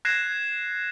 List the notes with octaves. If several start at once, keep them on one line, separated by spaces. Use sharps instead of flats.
F#6 G#6 A#6 C7 E7